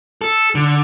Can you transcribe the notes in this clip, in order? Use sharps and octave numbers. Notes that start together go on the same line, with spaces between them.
A4
D3